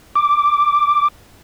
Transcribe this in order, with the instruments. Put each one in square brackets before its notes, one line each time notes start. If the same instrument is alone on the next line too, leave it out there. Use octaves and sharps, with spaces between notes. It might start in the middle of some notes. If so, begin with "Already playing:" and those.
[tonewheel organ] D6